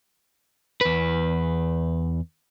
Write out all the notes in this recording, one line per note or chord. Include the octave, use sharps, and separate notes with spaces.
E2 B4